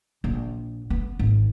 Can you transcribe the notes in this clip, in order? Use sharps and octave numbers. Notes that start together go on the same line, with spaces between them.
A#1
B3
G#1